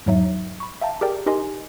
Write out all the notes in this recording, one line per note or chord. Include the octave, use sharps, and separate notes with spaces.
E2 G#2 F#3 D#4 E5
B5 C#6
E5 F5 G5 A5 A#5
G4 G#4 A#4 D5 G5
D#4 G4 A#4 D#5 G#5 C6